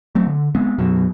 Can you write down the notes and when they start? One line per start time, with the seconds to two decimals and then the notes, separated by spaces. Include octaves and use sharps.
0.15 F#3 A3 C4
0.27 D3
0.55 G#3 B3 C4
0.78 B1 F#2 B2 F#3